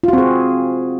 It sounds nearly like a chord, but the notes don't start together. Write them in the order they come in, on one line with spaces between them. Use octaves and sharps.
F4 F#4 C4 G#4